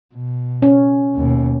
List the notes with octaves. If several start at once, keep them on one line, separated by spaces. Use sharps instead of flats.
B2
C#4
D#2 B2